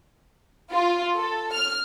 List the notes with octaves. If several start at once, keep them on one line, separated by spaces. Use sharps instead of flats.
F4
A4
F6